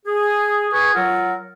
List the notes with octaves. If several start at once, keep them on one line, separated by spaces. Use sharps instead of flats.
G#4
G#4 B4 G#5 C#6
F#3 F4 A#4 F#5